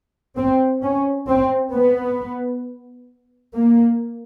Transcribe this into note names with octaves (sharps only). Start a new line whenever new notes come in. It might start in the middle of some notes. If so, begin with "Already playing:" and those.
C4
C#4
C4
B3
A#3